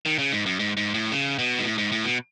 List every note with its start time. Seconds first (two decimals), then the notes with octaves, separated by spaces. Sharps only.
0.06 D#3
0.19 C#3
0.32 G#2
0.46 F#2
0.59 G#2
0.77 G#2
0.94 A2
1.12 C#3
1.39 B2
1.59 G#2
1.65 A2
1.78 G#2
1.92 A2
2.05 B2